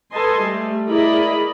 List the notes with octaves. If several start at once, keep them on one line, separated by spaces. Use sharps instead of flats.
A4 B4 D#5 G#5 A5 C6
G3 A3
E4 G#4 A#4 D5 D#5 B5